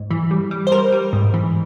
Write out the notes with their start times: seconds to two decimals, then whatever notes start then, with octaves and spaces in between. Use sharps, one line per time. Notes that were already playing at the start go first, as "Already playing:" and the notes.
Already playing: G#2
0.11 E3
0.31 G3
0.51 G3
0.67 C5
0.72 G3 A#4
0.92 G3
1.13 G#2
1.34 E3